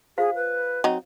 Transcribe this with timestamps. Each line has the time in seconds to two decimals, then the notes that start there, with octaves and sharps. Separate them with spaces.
0.18 F4 G#4 C5 F5
0.35 B4
0.84 F#3 C4 D#4